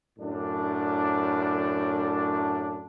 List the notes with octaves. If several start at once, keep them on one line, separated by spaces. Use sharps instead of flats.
F#2 A2 D4